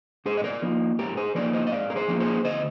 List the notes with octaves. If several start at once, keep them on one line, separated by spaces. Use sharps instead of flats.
G#2 G#4 C5
D#5
A#4 D5
F3 A#3 D#4
G#2 G4 A#4
G#4 C5
F3 A#3 D#4 A#4 D5
C5 D#5
D#5
G#2 D5 F5
A#4
G#4 C5
F3 A#3 D#4
G#4 C5
D2 C5 D#5